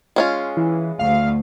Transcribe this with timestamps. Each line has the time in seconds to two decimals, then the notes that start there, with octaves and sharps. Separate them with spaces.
0.16 G#3 C#4 F4
0.57 E3
0.99 D2 F5